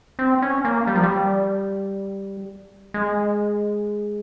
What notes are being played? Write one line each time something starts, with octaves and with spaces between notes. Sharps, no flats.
C4
C#4
A#3
G3
F3
G3
G#3